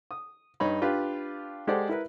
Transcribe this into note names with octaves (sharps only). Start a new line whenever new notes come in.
D#6
G2 D#4 C#5 B5
D4 F4 G4 B4
G#3 G4 A4 C5 D5 F#5
E4 A#4 B4